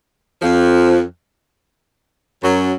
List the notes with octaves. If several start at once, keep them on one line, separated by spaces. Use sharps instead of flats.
F2 F3
F#2 F#3